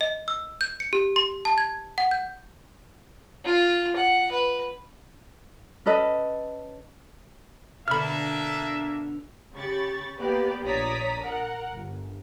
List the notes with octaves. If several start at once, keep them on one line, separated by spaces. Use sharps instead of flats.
D#5
E6
G6
C#7
G4
C6
A5
G#6
F#5
G6
F4
F#5
B4
C#4 A4 B4 D#5
B2 D3 A#3 D4 E5 B5 F6
C#3 G4 B5 C#6 A6
A#3 B3 G4 B4 D5
A#1 C#5 D5 A#5 D#6 B6
A#4 F#5
G1